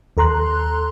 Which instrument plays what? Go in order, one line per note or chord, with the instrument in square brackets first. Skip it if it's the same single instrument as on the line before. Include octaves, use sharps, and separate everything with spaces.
[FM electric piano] D#2 A4 A#5 C6 F#6